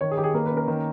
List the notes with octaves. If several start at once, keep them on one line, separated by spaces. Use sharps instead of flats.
D#3 C#5
G#4
D#3 G4
G#4
A#3 B4
B4
C#4
A#4
D#3